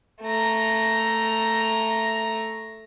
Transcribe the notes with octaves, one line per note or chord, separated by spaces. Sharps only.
A3 A#5